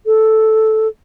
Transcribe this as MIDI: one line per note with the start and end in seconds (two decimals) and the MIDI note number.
0.06 0.87 69